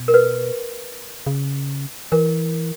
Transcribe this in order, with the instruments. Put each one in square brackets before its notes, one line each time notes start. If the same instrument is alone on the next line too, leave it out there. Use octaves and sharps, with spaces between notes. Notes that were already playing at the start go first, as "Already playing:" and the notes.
Already playing: [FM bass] B2
[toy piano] A#4
B4
[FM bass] C#3
[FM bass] E3 [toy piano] A#4